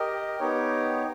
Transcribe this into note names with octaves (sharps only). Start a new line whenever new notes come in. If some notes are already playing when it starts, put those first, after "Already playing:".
Already playing: G4 A#4 D#5
B3 D#4 G4 C#5